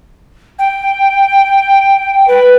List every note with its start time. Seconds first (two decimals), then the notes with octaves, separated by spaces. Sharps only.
0.59 G5
2.28 B4